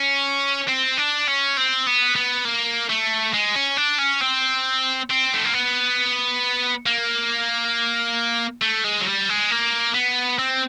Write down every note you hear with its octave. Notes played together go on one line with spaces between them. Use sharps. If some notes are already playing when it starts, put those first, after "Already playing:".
Already playing: C#4
C4
D4
C#4
C4
B3
B3
A#3
A3
G#3
C#4
D4
C#4
C4
C4
A3
A#3
B3
A#3
A3
G#3
F#3
G3
G#3
A#3
B3
C4